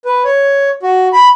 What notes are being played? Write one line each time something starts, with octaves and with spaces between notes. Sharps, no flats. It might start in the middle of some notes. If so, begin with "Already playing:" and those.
B4
C#5
F#4
B5